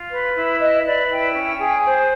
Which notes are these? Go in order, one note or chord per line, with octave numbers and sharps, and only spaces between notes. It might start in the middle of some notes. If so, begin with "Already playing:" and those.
Already playing: F4
B4
E4
B4 D#5
B4 D5
E4 G5
C#4
G#4
C5